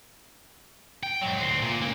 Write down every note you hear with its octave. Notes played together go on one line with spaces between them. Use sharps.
G5
G#2 F#3
D2 C4
A#2
C#2 A#3